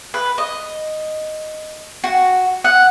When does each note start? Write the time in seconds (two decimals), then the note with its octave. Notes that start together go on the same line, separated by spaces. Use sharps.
0.14 B4
0.38 D#5
2.04 F#4
2.64 F#5